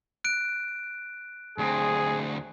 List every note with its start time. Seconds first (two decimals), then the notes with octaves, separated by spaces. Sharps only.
0.24 F#6 D7
1.58 D2 C4 G#4